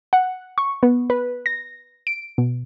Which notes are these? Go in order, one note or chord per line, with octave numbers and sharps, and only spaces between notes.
F#5
C#6
B3
B4
A#6
D7
B2